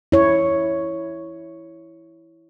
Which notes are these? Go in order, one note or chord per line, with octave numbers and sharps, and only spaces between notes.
E4 C#5